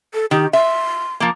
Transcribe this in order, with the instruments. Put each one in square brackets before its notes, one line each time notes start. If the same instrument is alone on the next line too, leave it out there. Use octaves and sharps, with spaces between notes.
[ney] A4
[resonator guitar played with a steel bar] D#3 [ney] G4
[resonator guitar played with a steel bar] E5 [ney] C6
[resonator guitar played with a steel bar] F3 A#3